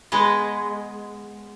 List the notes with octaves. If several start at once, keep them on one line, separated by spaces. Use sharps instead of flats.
G#3 B3 D#5